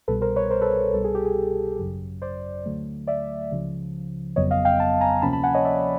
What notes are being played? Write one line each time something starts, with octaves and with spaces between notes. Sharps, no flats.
C2 B2 G3 A4 B4
A#4 C5
B4 C#5
A#4 C5
A4 B4
C2 B2 G3 A4
G#4
G4
G#4
G#1 F#2 C#3 F#3
C5 D5
D2 D3 F#3 A3
D5 E5
C#2 C#3 F3
G1 F2 C#3 F#3 B3 C#5 D#5
D#5 F5
F5 G5
G5 A5
G#5 A#5
D2 C3 F3 A#3 C#4 A5 B5
A5 B5
F#5 G#5
C#5 D#5
D5 E5